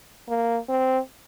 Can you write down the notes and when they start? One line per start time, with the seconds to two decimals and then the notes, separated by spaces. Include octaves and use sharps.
0.29 A#3
0.69 C4